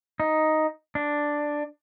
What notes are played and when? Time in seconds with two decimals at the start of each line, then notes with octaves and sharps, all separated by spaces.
0.20 D#4
0.95 D4